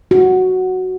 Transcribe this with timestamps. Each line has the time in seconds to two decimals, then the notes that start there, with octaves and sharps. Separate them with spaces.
0.11 F#4